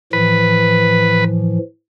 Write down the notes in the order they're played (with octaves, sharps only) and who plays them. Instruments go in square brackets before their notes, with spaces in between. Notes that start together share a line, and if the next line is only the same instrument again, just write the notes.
[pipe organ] A2 E3 F3 [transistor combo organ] B4